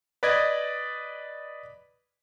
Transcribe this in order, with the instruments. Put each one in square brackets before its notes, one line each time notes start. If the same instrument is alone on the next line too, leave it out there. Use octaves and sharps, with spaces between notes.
[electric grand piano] B4 D5 D#5 G#6